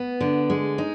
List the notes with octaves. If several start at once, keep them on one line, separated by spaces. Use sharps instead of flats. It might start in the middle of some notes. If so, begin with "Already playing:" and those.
Already playing: B3
D3
G#3
D#4